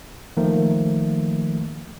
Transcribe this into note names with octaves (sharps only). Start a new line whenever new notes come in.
D#3 F3 A3 A#3